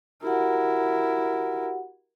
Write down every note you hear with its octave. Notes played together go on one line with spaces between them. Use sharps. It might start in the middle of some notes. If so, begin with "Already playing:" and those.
E4 F#4 G4 A#4 F#5